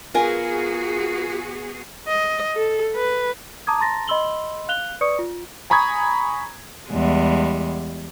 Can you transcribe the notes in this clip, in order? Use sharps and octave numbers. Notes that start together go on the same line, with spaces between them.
B3 F4 F#4 G#4 A#4 G#5
D#5
A4
B4
A5 A#5 D6 D#6 G#6
A5 A#5 C6 A6 A#6
D#5 B5 C6 E6 F#7 G7
F5 F#6 F7 G7
B4 D5 C#6 D#6 C#7
F4
G#5 A#5 B5 C#6 D#6 G#6
E2 G3 G#3